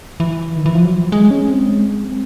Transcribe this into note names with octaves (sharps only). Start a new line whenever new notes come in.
E3
D#3
E3
F3
F#3
G#3
C#4
C4
G#3
C4